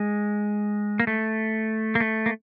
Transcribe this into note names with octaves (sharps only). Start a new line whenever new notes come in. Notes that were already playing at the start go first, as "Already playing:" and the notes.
Already playing: G#3
A#3
A3
A#3
A3
A#3